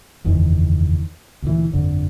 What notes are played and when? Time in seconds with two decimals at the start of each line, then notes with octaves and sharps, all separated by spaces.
0.24 F#1 E2 D#3
1.42 D2 A#2 E3
1.72 G1 F2 D3